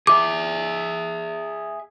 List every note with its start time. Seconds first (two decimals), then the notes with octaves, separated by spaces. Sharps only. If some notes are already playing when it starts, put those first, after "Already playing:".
0.07 G#4 E5 D6